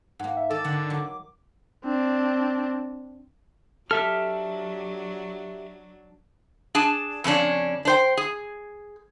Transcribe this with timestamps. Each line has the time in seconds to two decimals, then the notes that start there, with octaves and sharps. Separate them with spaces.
0.19 G#2 A#3 F#5
0.37 E5
0.51 D#3 A4 D6
0.64 D3 F#5
0.90 F#3
1.85 C4 D4
3.91 F#3 D4 G4 A4 E5 F6
6.75 D4 G#4 A5
7.24 F2 C#3 C#4 D4
7.85 D4 C5 G5
8.17 G#4